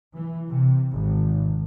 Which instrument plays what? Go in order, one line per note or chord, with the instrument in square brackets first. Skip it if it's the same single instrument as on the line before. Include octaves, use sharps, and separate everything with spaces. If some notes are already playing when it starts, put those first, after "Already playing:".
[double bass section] E3
C3
G#1